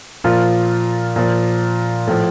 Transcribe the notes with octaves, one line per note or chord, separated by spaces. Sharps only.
A#2 F3 F4
A#2 F3
A2 F3